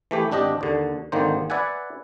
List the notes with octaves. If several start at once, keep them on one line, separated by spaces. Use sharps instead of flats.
E3 A3 G4
G#1 D4 G4 D#5 G5
D#2 D3
G#1 D3 D#3 A#3 C5
B4 D5 E5 F#5 G#5